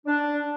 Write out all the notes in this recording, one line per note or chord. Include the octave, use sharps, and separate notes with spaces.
D4